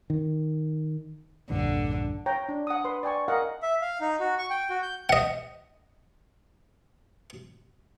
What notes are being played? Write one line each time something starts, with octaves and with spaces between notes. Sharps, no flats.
D#3
A#1 E2 G2 D3
C#5 G5 A#5
D4
F#5 D#6
B4 C6
D5 G5 G#5 C#6
A#4 D#5 F5 F#5 A#5
E5
F5
D#4
F#4
C#6
G5
F#4
G6
D#5 F#5